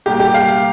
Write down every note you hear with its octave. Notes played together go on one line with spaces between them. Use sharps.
C2 A#2 G3 G4
G4
F5